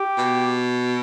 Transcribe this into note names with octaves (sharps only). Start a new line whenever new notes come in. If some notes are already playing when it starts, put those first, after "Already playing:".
Already playing: G4
B2